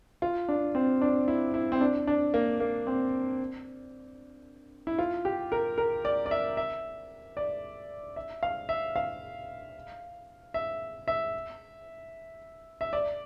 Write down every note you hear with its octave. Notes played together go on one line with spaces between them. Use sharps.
F4
D4
C4
D4
E4
E4
C4
D4
D4
A#3
A#3
C4
E4
F4
G4
A#4
A#4
D5
D5
E5
E5
D5
E5
F5
E5
F5
E5
E5
E5
D5